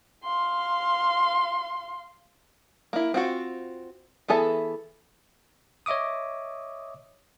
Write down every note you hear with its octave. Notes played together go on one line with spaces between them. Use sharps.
F5 C6
A#3 E4
C4 F4 F#4
E3 B3 G#4 A4 E5
C#5 D#5 E5 D6 D#6